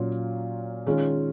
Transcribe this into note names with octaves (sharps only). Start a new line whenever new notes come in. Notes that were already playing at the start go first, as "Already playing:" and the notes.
Already playing: A#2 F#3 C#4 F4
D#3 G#3 C#4 F4